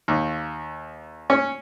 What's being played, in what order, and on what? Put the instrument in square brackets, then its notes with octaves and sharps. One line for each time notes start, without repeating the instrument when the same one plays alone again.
[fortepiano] D#2
C#4